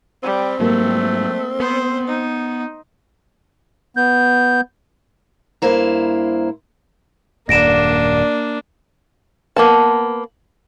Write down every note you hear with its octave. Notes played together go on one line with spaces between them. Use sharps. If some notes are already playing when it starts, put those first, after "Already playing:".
G3 C4
G#2 F#3 G3 A3 A#3
B3 C5
D#4
B3 G6
G2 A#3 E4 C5 A#5
D#1 F#2 A#3 D4 D5 A#6 D7 E7
A#3 B3 A5